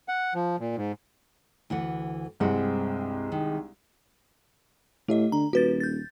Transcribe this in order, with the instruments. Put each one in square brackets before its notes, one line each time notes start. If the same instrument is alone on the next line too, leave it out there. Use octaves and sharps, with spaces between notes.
[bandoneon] F#5
F3
A#2
G#2
[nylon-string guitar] D2 E3 F#5
[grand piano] C2 G#3 [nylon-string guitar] G2 C4 F#5
[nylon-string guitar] D#3
[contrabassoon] A2 [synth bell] A3 G4 D#5
[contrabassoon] D3 [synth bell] A#5
[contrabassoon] D#1 [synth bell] F#4 B4 A6
[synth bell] G6 A6